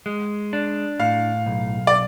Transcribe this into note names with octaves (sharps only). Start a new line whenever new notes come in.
G#3
D4
A2 F5
B1
D5